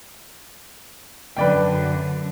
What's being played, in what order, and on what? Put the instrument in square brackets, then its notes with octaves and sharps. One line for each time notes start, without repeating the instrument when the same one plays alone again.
[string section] F#2 D3 [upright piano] B4 D5 G5